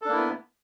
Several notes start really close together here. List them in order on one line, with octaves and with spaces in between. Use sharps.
A4 D4 A#3 E4 B3